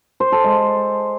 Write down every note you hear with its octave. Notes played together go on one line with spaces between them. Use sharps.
C5
A4
G#3